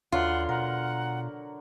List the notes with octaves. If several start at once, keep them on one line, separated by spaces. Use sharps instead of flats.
D#2 D3 F#3 F4 B4 F#5
B2 A#4 F#5